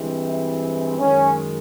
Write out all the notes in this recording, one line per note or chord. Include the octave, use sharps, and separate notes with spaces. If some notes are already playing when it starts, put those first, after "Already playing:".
Already playing: G2 E3 G#3 C4
E4
F#2 D#3 G#3 C#4